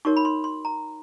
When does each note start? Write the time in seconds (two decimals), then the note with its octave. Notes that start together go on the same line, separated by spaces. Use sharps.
0.05 D#4 F#4 A#4 C#5 C#6
0.16 B5
0.25 C6
0.44 C6
0.65 A#5